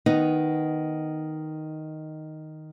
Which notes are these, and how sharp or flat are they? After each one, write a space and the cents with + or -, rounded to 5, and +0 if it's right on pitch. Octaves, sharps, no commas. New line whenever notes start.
D#3 +0 B3 +0 D#4 +0